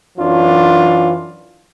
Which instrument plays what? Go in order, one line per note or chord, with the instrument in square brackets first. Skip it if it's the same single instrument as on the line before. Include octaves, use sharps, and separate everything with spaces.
[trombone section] F#2 E3 F#3 D4 F4